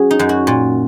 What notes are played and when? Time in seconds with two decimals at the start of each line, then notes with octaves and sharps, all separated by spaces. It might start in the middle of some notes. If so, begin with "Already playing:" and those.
Already playing: F#3 C#4 F#4 G#4
0.11 D#4
0.19 F#2
0.29 F#4
0.47 A#2